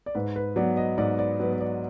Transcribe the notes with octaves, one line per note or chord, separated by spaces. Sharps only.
D5
G#2 B4
B4
F#3 B3 D5
D#5
G#2 D5
D5
F#3 B3 B4
B4
D5